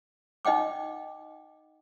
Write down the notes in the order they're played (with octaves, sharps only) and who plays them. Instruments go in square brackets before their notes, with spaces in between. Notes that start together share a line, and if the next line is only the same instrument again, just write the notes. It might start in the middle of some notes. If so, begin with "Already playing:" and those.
[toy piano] D#4 D#5 F#5 G5 D6